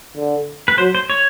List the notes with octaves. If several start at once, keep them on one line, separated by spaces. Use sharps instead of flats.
D3
B4
F#3 C5
C5
C#5